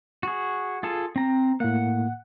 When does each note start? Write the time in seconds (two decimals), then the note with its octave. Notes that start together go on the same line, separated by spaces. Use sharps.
0.23 F#4 G#4
0.83 F4 G#4 A4
1.16 C4 A#5
1.60 A2 A#3 F#5